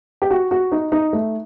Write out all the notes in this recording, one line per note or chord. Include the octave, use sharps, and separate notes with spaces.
G4
F#4
F#4
D#4
D#4
A3